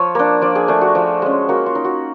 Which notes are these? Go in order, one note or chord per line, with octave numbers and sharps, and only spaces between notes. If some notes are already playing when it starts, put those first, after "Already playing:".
Already playing: F3 C#5
A#3 D4
F3 D5
G#4
A3 D4 G#4
F#4
F3
G#3 C#4
A#3 F#4
F4
D#4
F#4